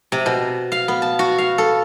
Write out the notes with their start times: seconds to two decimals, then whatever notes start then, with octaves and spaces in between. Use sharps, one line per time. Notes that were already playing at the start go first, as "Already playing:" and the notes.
0.12 C3
0.26 B2
0.72 F5
0.88 B3
1.02 A5
1.19 F#4
1.38 F5
1.58 A4